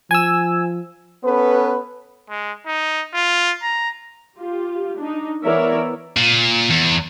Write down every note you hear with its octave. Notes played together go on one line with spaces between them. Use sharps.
F3 G#5 E6
B3 C#4 A4 B4
G#3
D#4
F4
A#5
F4 G4
D4 D#4
E3 B3 A#4 C#5 D5 E5
A#2
E2